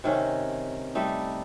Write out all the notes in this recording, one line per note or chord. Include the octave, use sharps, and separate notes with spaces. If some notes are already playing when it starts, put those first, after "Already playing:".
C3 D#3 C#4
G3 A3 D#4